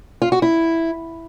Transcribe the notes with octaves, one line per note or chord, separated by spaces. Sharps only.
F4
F#4
E4